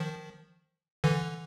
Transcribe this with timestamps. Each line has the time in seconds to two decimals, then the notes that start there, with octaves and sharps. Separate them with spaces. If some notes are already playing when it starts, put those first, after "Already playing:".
Already playing: D#3 F3
1.04 D3 E3